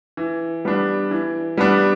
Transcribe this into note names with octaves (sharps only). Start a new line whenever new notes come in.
E3
G3 B3 D4
E3
G3 B3 D4